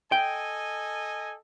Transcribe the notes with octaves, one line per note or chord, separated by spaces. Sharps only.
A4 D#5 G5 G#5